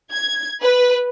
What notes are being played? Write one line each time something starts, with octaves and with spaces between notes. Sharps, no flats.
G#6
B4